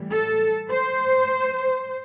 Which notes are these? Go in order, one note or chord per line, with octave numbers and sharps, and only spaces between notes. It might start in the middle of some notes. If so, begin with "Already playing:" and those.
Already playing: A2 E3 G3
A4
C5